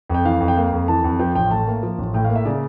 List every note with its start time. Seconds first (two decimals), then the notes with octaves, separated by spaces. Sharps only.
0.09 F2 G5
0.25 E3 F5
0.40 F2
0.48 G5
0.57 A#3 F5
0.72 F2
0.88 E3 A5
1.04 F2
1.19 F3 G5
1.35 A1 G5
1.51 A2 A5
1.67 A#3
1.83 F3
1.98 A1
2.14 A2 G5
2.24 F5
2.29 A#3
2.36 E5
2.45 C#3 D5